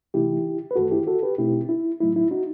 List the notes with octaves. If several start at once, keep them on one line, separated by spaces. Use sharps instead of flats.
C3 E3 A3 D#4 E4 G4
B4
F#2 D#3 A3 F#4 A4
E4 G4
F#4 A4
G4 B4
B2 A3 C4 D#4 E4 G4
E4
A2 F#3 A3 D#4 E4
E4
D#4 F#4